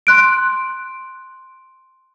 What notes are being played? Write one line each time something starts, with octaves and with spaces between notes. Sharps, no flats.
C6 F#6 D7